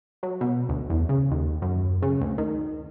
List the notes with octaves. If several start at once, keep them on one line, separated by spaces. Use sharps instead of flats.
F#3
B2
D2
E2
C#3
D#2
F#2
C#3
D2
D#3